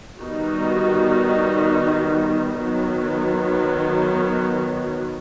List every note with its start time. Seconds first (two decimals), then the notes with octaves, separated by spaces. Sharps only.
0.19 D#3 G3 B3 D#4 F#4
2.63 D#3 F#3 B3